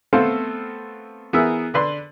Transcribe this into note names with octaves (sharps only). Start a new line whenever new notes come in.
A3 B3 C4 A4 C5 F5
E3 B3 G#4 A#4 E5 E6
D3 D4 B4 C6